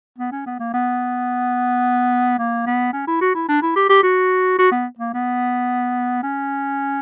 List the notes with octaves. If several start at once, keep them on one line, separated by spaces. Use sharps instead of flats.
B3
C#4
B3
A#3
B3
A#3
B3
C#4
E4
F#4
E4
D4
E4
G4
G4
F#4
F#4
B3
A#3
B3
C#4